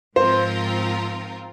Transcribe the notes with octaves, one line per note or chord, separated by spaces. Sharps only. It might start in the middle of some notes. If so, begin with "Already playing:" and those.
G#2 F3 C4 F4 A#4 C5